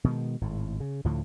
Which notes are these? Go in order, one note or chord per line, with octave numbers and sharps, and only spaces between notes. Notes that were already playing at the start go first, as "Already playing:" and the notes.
B2 D#3 F3 G#3
G#1 A2
C#3
D2 A2 D3 F3